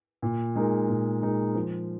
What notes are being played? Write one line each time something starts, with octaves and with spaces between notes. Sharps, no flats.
A#2
G#3 D#4 A#4
A#2
G#3 D#4 A#4
F3